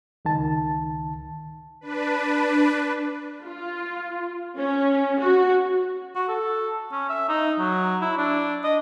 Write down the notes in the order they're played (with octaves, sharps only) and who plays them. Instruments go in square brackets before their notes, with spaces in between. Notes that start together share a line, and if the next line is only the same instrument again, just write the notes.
[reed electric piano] C#2 D#3 A5
[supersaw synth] D4 B4
[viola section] F4
C#4
F#4
[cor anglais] F#4
A4
C#4
E5
D#4
F#3
E4
D4
D#5